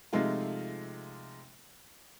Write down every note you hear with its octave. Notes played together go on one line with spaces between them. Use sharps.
C3 F3 G#3 A3 D#4 F4